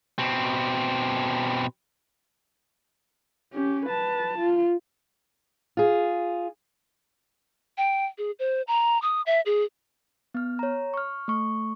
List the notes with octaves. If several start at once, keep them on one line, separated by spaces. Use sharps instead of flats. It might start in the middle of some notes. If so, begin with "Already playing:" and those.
B2 C4
C#4 G4
B4 A5
F4
F4 G#4
G5
G#4
C5
A#5
D#6
E5
G#4
B3 F6
C#5 A#5
C#6 F6
A3 C#6